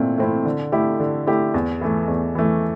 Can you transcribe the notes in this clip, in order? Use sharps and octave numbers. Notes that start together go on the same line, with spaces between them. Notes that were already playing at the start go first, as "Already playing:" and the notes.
Already playing: A#2 A3 C4 E4
A3 C4 E4
D3
A3 E4 G4
D3
A3 E4 G4
E2
E3 A3
E2
E3 A3